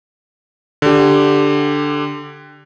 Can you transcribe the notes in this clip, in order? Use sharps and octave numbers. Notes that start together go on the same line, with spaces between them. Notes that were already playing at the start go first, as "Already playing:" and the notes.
D3 G4